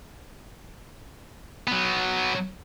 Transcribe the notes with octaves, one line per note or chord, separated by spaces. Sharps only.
F#3 B3